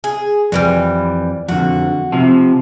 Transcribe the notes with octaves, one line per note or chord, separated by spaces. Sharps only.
G#4
F2 D3 E3 G3
F2 D3 F#4
C3 F3